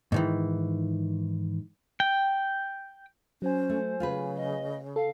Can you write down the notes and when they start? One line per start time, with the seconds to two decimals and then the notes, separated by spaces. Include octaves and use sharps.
0.12 G#2 D#3 E3
2.00 G5
3.42 F#3 C#4 C5 G#5
3.69 A3
4.00 C#3 F4 G#4 B4
4.36 D#5
4.96 A4 F5